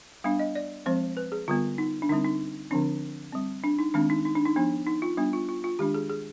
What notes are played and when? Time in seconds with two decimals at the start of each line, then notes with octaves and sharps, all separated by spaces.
0.24 G3 B3 D4 F5
0.39 D#5
0.55 D5
0.86 F3 G#3 C4 C5
1.17 B4
1.32 G#4
1.48 D3 G3 B3 F4
1.78 D#4
2.02 D4
2.09 D3 G3 C4 D#4
2.25 D#4
2.71 D3 F3 C4 D4
3.32 G3 C4
3.64 D4
3.79 D#4
3.94 D#3 G#3 C4 D4
4.10 D#4
4.25 D#4
4.35 D4
4.45 D#4
4.56 F3 B3 D4
4.87 D#4
5.02 F4
5.17 G3 B3 D4
5.33 F4
5.49 F4
5.64 F4
5.79 D#3 G#3 D4 G4
5.94 G#4
6.10 G#4